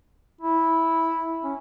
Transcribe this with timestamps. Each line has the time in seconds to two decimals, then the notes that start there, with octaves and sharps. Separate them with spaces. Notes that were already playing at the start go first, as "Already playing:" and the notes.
0.41 E4
1.44 C#4